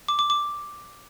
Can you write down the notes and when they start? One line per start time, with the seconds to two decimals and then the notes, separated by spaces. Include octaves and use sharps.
0.08 D6
0.19 D6
0.30 D6